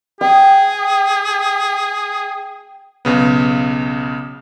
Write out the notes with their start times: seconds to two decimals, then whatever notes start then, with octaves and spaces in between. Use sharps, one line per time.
0.21 G#4 G5
3.05 B1 C#3 B3